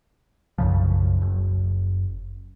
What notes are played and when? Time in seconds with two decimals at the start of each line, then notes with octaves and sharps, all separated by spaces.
0.58 B1 F#2 C#3 F3
1.22 F#1